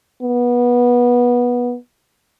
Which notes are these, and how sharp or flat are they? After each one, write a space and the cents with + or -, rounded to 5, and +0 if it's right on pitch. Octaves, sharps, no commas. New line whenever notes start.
B3 -20